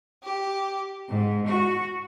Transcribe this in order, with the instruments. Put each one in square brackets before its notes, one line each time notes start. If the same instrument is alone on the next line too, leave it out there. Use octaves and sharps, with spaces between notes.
[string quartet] G4
G#2
F#4